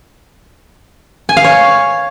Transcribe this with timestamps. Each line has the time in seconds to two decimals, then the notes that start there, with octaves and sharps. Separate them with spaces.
1.29 G#5
1.37 F5
1.44 C#5